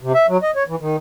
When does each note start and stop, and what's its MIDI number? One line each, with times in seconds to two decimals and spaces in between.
0.01 0.13 48
0.15 0.26 76
0.28 0.37 54
0.43 0.51 75
0.56 0.63 73
0.68 0.76 52
0.80 0.96 51